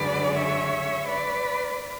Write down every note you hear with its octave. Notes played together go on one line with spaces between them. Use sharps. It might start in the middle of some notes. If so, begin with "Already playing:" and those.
Already playing: F#2 D3 G#3 B4 D5
C#5 E5
B4 D5